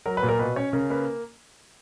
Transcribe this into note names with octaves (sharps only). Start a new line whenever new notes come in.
F#3 A#4
B4
A#2
A#4
B2 B4
C#4 C#5
C#3 A#4
A#3 B4